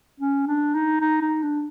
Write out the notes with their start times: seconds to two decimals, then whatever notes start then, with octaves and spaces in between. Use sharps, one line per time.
0.20 C#4
0.47 D4
0.74 D#4
1.01 D#4
1.21 D#4
1.43 D4